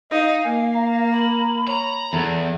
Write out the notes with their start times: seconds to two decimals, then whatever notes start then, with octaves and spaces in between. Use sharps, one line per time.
0.11 D#4 D#5 F5
0.44 A#3 G#5
0.75 A#5
1.11 B5
1.68 C#5 A#5
2.13 E2 G#4 A4